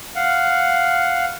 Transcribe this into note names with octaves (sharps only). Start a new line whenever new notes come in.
F5 F#5